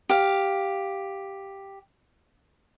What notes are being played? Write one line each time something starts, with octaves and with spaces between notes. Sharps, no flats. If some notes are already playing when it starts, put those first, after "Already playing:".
G4 F5